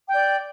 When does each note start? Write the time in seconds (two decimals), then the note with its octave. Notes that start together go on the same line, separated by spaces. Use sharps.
0.08 G5
0.11 G6
0.15 D5